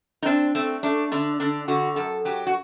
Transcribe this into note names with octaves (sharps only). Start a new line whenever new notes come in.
D#4
C4 D4
A3 C4
A3 D4
D3 D4
D3 D4
D3 F#4
F#2 A4
F#3 G4
F#4